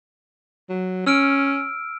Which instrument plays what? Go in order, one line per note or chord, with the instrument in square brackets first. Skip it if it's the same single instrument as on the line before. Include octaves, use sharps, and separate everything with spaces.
[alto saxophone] F#3
[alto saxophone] C#4 [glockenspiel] E6 F6 D7